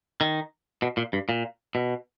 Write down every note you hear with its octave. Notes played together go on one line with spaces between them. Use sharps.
D#3
B2
A#2
G2
A#2
B2